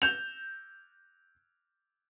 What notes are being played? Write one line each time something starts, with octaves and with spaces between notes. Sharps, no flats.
G6 E7 F7